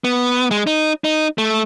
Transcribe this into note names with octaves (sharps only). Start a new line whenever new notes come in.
B3
G#3
D#4
D#4
A3